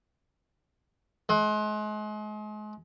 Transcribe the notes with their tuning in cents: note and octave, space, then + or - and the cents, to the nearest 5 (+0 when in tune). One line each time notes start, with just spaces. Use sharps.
G#3 +35